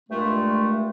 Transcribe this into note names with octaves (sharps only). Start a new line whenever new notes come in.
G2 A#2 G#3 A3